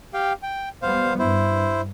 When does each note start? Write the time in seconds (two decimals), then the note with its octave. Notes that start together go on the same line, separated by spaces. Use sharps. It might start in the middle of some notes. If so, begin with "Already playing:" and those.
0.14 G4 F5 G5
0.43 G5
0.82 G3 B3 C5 F5
1.19 G2 E4 C5